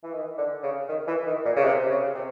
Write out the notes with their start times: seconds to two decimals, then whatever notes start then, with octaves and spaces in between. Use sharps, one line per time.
0.03 E3
0.13 D#3
0.38 D3
0.63 C#3
0.88 D#3
1.07 E3
1.27 D#3
1.45 A#2
1.56 C#3
1.64 C3
1.89 C#3
2.14 C3